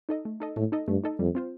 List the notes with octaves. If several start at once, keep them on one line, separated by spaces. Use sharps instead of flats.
D#4 A4 D#5
A3
D#4 A4 D#5
A2 A3
D#4 A4 D#5
G2 A3
D#4 A4 D#5
F2 G3
C4 F4 C5